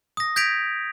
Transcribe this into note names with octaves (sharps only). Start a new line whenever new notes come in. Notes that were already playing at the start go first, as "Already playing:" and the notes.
D#6 A#6
G6 G#6 A#6 B6 D7 F7